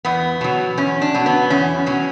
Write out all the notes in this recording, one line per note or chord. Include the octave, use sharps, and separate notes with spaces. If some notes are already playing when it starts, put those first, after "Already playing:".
E2 B3
B2 F#3
E2 C#4
D4
B2 F#3
B3
E2 C#4
B2 F#3